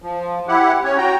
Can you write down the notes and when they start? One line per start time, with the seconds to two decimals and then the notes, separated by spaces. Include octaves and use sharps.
0.02 F3
0.48 E4 G4 F#5
0.84 C#4 C#5
0.98 F#4 G5 A#5